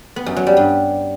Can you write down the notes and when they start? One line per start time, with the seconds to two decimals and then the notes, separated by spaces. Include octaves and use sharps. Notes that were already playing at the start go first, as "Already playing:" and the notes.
0.16 B3
0.26 F#2
0.37 F#3
0.47 G3
0.57 G2